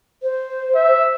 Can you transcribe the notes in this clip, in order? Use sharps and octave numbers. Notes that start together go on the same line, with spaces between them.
C5
E5